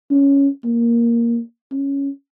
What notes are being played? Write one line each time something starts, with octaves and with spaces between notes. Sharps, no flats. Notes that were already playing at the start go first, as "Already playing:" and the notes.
C#4
A#3
C#4